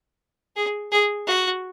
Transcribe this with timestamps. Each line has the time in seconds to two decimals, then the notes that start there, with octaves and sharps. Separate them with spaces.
0.56 G#4
0.91 G#4
1.27 F#4